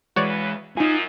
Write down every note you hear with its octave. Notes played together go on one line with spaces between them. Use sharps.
E2 C#3 E3 G#3 F#4 B4 C#5 D5
F#2 D#4 F4 G#5 D#6